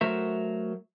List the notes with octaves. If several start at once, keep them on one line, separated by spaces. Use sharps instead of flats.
F#3 A3 F#4 A#4 C5 E5